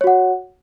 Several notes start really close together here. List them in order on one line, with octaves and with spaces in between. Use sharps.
C#5 F#4 F#5